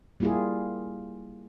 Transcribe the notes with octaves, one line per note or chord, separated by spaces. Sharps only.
G3 A#3 E4 F4 G4 G#4